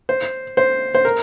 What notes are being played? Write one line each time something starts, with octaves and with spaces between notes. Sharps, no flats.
C5
C5
C5
A#4